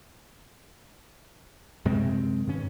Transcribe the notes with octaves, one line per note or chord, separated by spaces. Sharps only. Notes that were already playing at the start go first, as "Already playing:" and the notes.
F#2 C3 G#3 C4
G2 D#3 C#4